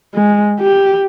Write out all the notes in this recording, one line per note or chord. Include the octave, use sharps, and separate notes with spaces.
G#3
G4